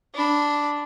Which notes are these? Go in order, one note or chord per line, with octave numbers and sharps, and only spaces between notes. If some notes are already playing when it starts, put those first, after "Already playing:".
D4 B5